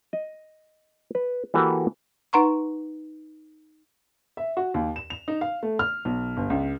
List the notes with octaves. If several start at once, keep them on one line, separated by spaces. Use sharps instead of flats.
D#5
B4
E3 A#3 F#4 G4 A4 B4
D#4 B4 F#5 A#5 C6 C#6
E5
F#4
D#2
E7
F7
D#4
F5
A3
F6
B1
G1
C#2